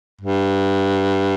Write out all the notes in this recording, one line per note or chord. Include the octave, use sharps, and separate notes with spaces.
G2